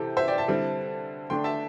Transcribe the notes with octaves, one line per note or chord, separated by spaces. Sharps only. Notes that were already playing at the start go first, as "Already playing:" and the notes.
Already playing: C3 E3 C4 G4 A4
C5 E5
D5 G5
E5 A5
D3 G3 C4 E4
D3 A3 D4 G5 C6
E5 A5